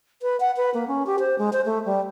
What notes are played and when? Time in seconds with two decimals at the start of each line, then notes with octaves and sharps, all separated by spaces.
0.22 B4
0.40 F#5
0.57 B4
0.74 A#3
0.88 C#4
1.06 G4
1.19 C5
1.39 G#3
1.53 C5
1.65 A3
1.85 G3